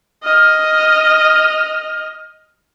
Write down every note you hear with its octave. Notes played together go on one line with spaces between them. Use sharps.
D#5 F6